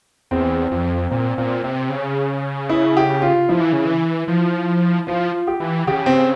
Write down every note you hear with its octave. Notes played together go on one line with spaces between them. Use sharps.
E2 C4
F2
A#2 C4
A#2 C4
C3 C4
C#3
E4
G4
F4
F3 E4
E3
C#3
E3
F3
F3 F4
G4
E3
C#3 G4
C4